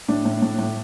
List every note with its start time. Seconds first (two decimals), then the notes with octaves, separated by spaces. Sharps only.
0.08 A2 D4
0.25 A2
0.42 A2
0.59 A2